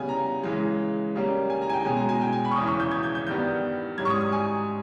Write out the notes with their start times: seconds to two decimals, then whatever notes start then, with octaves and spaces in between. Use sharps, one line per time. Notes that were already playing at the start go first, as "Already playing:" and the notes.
Already playing: C#3 G3 B3 G#5
0.09 A#5
0.43 C#3 E3 G#3
1.15 C#3 G3 A#3 C#4
1.50 G#5
1.62 A#5
1.69 G#5
1.73 G5
1.85 B2 G#3 C#4 G#5
1.97 A#5
2.09 G#5
2.21 G5
2.32 G#5
2.45 B5
2.51 C#6
2.56 E2 C#3 E3 D#6
2.67 C#6
2.80 G6
2.91 G#6
3.03 G6
3.15 G6
3.27 G2 D#3 G3 B3 G6
3.98 G#2 G3 C#4 G#6
4.05 C#6
4.10 D#6
4.21 D#6
4.32 G#5